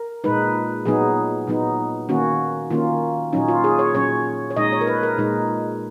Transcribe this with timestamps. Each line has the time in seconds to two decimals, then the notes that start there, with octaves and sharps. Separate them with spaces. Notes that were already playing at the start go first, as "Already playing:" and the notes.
Already playing: A#4
0.24 A#2 G#3 D#4 B4
0.86 A#2 F#3 B3 D#4 G#4
1.47 A#2 F#3 B3 D#4
2.09 D#3 A#3 C#4 F#4
2.70 D#3 A#3 C#4 F4
3.33 A#2 F#3 C#4 D#4
3.48 F4
3.64 G#4
3.79 C#5
3.94 A#2 F#3 C#4 C#5
4.51 C#5
4.56 A#2 G#3 D#4 D#5
4.72 C#5
4.81 A#4
4.87 B4
5.03 A#4
5.18 A#2 G#3 D#4